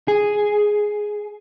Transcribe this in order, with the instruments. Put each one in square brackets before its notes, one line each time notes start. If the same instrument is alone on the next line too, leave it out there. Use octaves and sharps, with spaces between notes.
[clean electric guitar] G#4